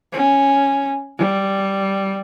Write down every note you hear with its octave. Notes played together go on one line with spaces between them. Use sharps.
C#4
G3